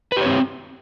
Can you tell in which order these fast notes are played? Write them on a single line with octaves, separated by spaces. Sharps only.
B4 G4 C#5 C4